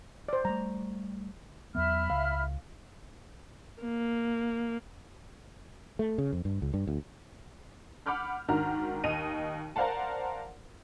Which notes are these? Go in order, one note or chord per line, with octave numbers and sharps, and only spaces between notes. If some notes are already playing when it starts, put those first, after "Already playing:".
C5 D5
G3 A3 A#5
E2 F#3 B3 E5 B5 F6
C#2 F5
A#3
A3
C#3
F2
G2
C#2
G2
D2
F#5 B5 D6 F6 G6
G#2 D#3 D4 F#4 A#5 F6
D#2 D#5 D#7 F7
A#4 C5 D5 F5 F#5 A5